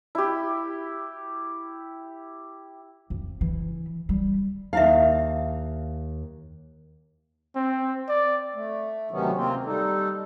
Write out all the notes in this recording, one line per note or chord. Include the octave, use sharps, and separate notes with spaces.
E4 G4
F2
E3
G3
D#2 D#4 E4 E5 F5
C4
D5
A3
D2 C3 D#3 F#3 B3 C#4
C3 A#3 C4 F4
G3 D#4 A4